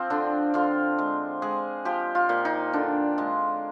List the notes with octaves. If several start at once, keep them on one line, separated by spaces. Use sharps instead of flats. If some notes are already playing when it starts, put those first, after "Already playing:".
Already playing: F3 C4
D3 D4
D3 F4
G#3
G#3 G#4
F3 G4
F4
A#2
D#4
D3 D4
G#3